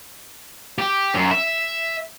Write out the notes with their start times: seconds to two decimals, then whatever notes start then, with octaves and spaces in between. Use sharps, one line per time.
0.79 G4
1.14 F#2
1.31 E5